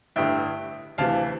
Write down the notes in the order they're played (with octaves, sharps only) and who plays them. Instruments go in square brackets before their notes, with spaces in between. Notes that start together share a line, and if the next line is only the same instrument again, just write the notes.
[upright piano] A1 G2 D3 E5 G5
D2 C3 E3 F5 A5